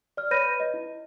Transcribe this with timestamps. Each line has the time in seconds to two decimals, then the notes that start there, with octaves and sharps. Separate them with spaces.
0.17 D5 F6
0.31 B4 C#5 B5 G6 A#6 D#7
0.60 D#5
0.74 E4